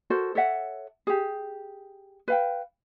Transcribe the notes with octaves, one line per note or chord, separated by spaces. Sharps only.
F#4 A4 A#4 C5
A4 C#5 E5 F#5
G4 G#4
B4 F5 G5